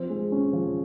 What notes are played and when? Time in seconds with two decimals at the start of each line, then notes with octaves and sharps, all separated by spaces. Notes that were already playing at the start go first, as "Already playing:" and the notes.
Already playing: F3 C4
0.10 G#3
0.32 C#4
0.53 F3